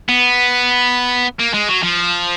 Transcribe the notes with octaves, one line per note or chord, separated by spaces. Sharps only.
B3
A#3
G#3
F#3
F3